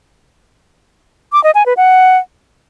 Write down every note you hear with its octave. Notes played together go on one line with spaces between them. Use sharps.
D6
D#5
G#5
B4
F#5